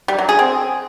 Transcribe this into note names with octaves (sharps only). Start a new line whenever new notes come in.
G3
F#3
G#4
C4